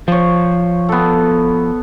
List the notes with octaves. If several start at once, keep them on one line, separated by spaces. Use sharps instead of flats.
F3 C5 C#5
B3 A4